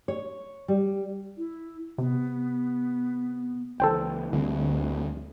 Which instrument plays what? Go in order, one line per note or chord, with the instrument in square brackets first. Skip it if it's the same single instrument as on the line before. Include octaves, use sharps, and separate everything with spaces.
[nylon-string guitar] C#5
G3
[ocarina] E4
[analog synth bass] C3 [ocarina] B3
[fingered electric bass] C#2 E3 [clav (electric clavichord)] A4 C5 G5
[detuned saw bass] D2 [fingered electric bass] D3 G3 C4